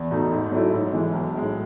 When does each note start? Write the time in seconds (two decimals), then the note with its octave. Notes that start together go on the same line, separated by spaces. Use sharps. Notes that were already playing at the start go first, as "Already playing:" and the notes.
Already playing: E2
0.11 B2 A3 D#4
0.32 G#2
0.52 F#3 A3 E4
0.73 G#2
0.93 E3 G#3
1.13 B1
1.34 A2 G#3